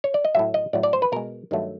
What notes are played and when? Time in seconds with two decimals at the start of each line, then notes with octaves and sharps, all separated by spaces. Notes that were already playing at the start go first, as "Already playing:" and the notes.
0.04 C#5
0.14 D5
0.25 D#5
0.34 A2 F#3 A3 E5
0.54 D#5
0.73 A2 F#3 A3 D5
0.83 D5
0.93 C5
1.02 B4
1.12 B2 G#3 A#4
1.51 G2 D#3 F#3 A3